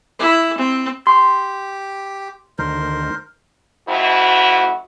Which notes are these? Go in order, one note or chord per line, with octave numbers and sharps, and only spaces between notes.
E4
C4
G4 C6
D2 D#3 A#4 C5
F2 G#2 E4 F#4